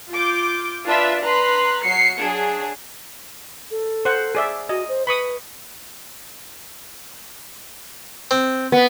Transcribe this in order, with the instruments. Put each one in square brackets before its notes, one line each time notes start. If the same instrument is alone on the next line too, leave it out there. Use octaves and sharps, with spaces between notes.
[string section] F4 D6 G6
D4 F4 B4 E5
B4 A#5 C6 F#6
F#3 C7 C#7
F#3 D4 G#4
[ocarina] A4
[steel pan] C5 F#5
G#4 D5 E5
[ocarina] F#4 [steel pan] D#5
[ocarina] C5
[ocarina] B4 [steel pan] B5 C#6 D#6
[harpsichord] C4
[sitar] B3